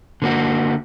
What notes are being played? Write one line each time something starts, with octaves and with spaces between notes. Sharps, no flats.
D3 A#3 F#4